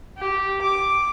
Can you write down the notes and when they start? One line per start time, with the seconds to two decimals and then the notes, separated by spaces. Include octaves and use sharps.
0.19 G4
0.62 D6